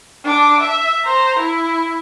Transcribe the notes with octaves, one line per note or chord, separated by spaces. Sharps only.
D4 D6
E5
C5 A#5
E4